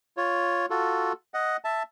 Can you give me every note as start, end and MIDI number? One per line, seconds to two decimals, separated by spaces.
0.17 0.66 65
0.17 0.66 73
0.70 1.13 65
0.70 1.13 66
0.70 1.13 69
1.34 1.57 75
1.34 1.57 78
1.65 1.83 76
1.65 1.83 81